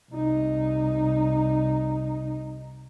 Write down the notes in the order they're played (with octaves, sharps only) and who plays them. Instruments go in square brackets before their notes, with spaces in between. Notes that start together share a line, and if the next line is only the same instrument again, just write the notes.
[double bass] C2 D#4